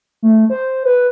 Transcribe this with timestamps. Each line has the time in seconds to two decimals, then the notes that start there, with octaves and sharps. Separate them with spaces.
0.22 A3
0.50 C5
0.85 B4